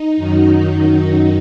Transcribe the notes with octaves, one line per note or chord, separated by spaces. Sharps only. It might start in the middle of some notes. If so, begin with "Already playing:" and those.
Already playing: D#4
F#2 D#3 F#3